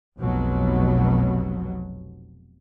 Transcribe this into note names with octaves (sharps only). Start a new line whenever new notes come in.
F1 B1 B2 F#3